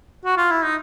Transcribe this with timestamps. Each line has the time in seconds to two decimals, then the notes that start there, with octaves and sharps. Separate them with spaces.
0.25 F#4
0.37 F4
0.50 E4
0.63 D#4